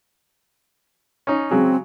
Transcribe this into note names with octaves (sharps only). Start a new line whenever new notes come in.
C#4 D#4
C#3 F#3 G#3 C4